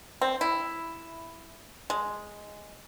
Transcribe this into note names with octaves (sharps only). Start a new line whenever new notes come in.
C4
E4
G#3